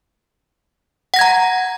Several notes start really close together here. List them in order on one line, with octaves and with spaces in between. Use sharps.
F#5 A#6 G#6 A#5